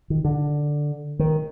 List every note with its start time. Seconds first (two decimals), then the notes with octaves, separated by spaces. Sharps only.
0.10 D#3
0.25 D3
1.19 D#3